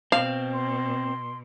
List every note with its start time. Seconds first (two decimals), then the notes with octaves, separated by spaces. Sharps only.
0.12 B2 C4 F5
0.53 C6